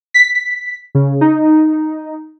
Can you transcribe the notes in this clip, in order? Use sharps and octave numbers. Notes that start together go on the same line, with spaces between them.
B6
B6
C#3
D#4